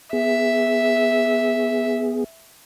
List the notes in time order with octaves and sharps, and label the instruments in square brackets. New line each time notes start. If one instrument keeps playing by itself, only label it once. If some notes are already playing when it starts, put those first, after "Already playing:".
[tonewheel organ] B3 G#4 [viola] E5